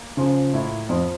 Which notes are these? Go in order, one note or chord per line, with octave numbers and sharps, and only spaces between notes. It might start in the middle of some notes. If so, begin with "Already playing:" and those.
Already playing: A#3 A#4
C#3 F3
A2 A#3 E4 A#4
F2 F3